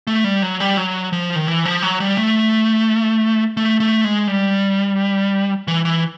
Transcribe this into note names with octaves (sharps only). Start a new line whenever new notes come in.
A3
G3
F#3
G3
F#3
F3
D#3
E3
F3
F#3
G3
A3
A3
A3
G#3
G3
E3
E3